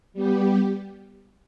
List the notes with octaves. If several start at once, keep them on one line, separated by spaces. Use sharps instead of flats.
G3 B3 G4